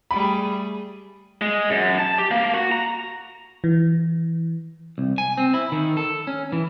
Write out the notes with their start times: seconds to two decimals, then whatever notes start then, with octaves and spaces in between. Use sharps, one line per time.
0.11 G3 A3 G#4 B5
1.42 G#3
1.70 F#2
1.99 A5
2.18 G4
2.31 A#3
2.54 F#4
2.72 A#5
3.64 E3
4.98 C2
5.18 G#5
5.38 C4
5.54 E4
5.72 D#3
5.97 A4
6.27 C#4
6.52 E3